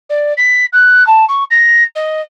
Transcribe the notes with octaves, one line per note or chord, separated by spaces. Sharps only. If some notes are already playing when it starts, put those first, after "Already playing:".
D5
B6
F#6
A5
C#6
A#6
D#5